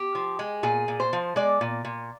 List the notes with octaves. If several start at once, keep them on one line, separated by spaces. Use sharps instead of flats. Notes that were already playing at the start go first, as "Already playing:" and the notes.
Already playing: G4
F3
G#3
A#2 G#4
A#2
C5
F3
G#3 D5
A#2
A#2